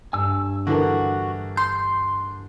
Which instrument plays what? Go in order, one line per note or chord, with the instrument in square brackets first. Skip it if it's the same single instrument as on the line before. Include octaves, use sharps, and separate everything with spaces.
[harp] G2 [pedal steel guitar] G#5 E6
[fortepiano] D3 E3 A#4 [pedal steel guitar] F#4
[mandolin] C6 [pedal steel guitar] G6